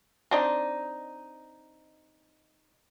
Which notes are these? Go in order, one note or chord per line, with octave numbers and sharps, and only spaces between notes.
C4 D4 D#4